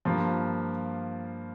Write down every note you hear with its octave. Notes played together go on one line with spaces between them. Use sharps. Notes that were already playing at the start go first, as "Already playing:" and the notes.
G2 F3 A#3 F4